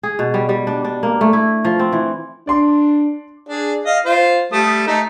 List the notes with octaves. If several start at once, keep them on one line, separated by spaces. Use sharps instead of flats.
G#4
B2
G3
G3
D4
D4
A#3
A3
E4
F3
C4
E3
D4 D5 C6 D6
D4 G#4
D#5 F5
F4 C5
G3 A3 D#6
A3 D#4